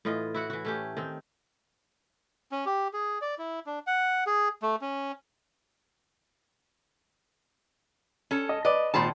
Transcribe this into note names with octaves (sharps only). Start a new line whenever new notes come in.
A2 E3 F4 D#5
E4 F#4 F#5
E3 F#4
A3 C#4 G4
D#3 C4
C#4
G4
G#4
D5
E4
D4
F#5
G#4
A3
C#4
C#4 A4
D#5
B4 D5 D#5
G#1 A#2 C5 A5 B5 C6